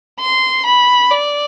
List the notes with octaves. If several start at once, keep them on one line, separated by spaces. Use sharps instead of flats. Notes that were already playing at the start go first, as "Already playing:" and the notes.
C6
B5
D5